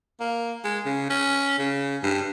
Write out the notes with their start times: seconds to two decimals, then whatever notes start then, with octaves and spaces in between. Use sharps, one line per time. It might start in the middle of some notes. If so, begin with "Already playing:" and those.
0.20 A#3
0.65 G#3
0.86 C#3
1.10 C#4
1.59 C#3
2.03 G2